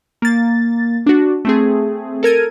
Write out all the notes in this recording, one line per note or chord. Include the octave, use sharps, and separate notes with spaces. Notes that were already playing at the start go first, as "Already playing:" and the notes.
A#3 A6
D4 F#4
A3 C4 G#4
A4 A#4 G#6 D#7